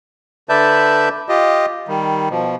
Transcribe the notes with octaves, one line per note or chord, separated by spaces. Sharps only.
D3 B4 D5 E5 A5 G6
F4 G4 D#5
D#3 G3
B2 F3